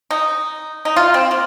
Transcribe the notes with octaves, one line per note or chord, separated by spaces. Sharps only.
D#4
D#4
F4
C4
A#3